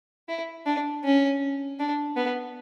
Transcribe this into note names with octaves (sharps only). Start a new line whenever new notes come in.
E4
D4
C#4
D4
B3